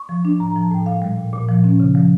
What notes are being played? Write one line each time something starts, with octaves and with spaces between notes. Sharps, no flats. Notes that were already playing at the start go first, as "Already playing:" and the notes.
Already playing: C#6
F3
D4
A2 A#5
F3 A#5
A5
A2 G5
A#2 F5
G3
A#2
A#2
F3
C#4
C#3
F3